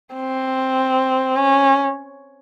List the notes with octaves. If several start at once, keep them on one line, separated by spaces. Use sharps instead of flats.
C4
C#4